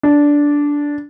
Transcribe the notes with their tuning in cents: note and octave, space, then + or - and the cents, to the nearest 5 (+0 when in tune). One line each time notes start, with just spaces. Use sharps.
D4 -10